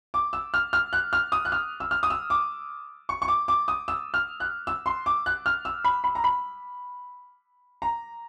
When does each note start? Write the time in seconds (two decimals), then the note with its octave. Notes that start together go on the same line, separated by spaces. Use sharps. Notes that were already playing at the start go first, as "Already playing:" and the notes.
0.14 D6
0.33 E6
0.54 F6
0.73 F6
0.93 F#6
1.13 F6
1.32 D#6
1.45 F#6
1.52 F6
1.80 E6
1.91 F6
2.03 D#6
2.10 E6
2.30 D6
3.09 C#6
3.22 C#6
3.28 D6
3.48 D6
3.68 D#6
3.88 E6
4.14 F6
4.40 F#6
4.67 E6
4.86 C6
5.06 D6
5.26 F#6
5.46 F6
5.65 E6
5.85 B5
6.04 B5
6.15 A#5
6.24 B5
7.82 A#5